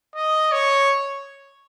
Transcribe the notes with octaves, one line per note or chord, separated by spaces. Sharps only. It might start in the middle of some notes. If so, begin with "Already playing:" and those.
D#5
C#5